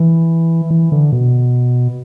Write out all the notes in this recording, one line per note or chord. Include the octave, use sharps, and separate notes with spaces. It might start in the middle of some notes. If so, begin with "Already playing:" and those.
Already playing: E3
E3
D3
B2